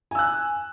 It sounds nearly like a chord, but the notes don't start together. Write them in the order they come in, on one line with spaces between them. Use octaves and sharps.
G#5 E6 F#6